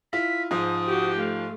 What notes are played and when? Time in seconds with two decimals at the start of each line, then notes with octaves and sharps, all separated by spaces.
0.13 E4 F4 B6
0.51 G#2 F3 D#6
0.86 F#4 G4
1.18 A3 F5